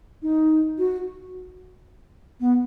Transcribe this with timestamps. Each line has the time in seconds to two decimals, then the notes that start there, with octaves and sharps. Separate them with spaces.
0.22 D#4
0.78 F#4
2.40 B3